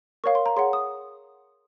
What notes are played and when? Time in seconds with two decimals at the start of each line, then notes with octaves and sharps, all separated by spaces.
0.24 A#4 C#5 F5 C#6
0.35 C6
0.46 A#5
0.56 G#4 C#5 F#5 C6
0.73 D#6